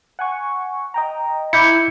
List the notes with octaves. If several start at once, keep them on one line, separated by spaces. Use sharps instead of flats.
F#5 G#5 C#6
D#5 G5 A#5
E4 D6 G6 C#7